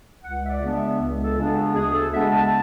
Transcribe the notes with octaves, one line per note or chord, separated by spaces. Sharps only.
C#2 F#5
E5
D5
C#3 G#3 B3 D4
E5
C#2
A4
C#3 G#3 B3 D4
F#4
D2 G#4
A4
C#3 G#3 B3 D4 E5
A5